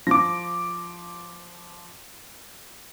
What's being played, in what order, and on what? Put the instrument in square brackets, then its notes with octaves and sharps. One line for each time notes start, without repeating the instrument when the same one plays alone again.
[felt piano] F3 [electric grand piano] D6 A#6